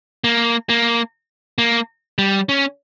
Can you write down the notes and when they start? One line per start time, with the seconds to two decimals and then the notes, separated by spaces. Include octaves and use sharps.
0.24 A#3
0.69 A#3
1.58 A#3
2.18 G3
2.49 C#4